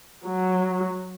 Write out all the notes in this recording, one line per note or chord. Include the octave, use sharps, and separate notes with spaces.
F#3